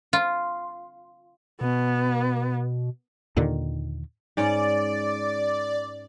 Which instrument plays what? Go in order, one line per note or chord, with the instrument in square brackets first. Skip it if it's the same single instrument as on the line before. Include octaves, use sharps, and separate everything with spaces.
[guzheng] F4
[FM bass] B2 [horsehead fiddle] B3
[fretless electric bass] D#2 A#2 D3 D#3
[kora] G#2 C#4 [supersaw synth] D5